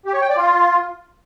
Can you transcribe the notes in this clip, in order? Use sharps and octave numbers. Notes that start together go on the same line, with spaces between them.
G4
C#5
G5
D5
F4